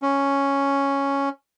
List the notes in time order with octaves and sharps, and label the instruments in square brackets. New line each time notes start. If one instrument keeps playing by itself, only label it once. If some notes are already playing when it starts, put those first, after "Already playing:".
[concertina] C#4